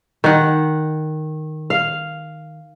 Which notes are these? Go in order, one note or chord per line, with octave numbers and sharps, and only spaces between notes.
D#3 F#5
F5